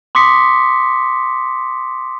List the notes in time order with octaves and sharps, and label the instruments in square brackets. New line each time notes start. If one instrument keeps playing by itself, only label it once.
[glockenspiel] C6 D6 D#6 B6 C#7